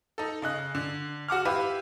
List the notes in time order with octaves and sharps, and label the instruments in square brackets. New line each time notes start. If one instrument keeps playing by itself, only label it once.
[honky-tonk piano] D#4 A4
C#3 D#5 F#6
D3
F#4 F#5 D6 F6
E4 F4 G4 B4